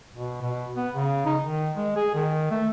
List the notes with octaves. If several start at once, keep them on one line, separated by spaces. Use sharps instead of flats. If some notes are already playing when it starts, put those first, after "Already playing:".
B2
B2
B3
C#3
D#4
D#3
G#3
G#4
D#3
A3